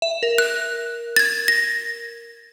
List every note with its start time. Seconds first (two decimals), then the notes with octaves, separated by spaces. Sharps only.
0.02 E5
0.23 A#4
0.38 F#6
1.16 G#6 A6
1.48 A#6